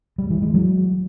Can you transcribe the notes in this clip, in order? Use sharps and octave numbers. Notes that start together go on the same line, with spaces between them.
G3
E3
G#3
F#3